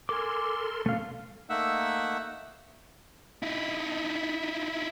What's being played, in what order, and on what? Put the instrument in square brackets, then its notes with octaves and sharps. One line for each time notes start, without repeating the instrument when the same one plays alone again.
[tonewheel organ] A4 A#4 C6 [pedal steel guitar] G#5 D6
[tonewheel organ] B2 C#4 [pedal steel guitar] A3 F5
[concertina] A3 A#3 D#4 E5 F#5 E6
[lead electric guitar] D#4 E4